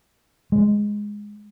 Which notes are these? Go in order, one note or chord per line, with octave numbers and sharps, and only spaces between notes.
G#3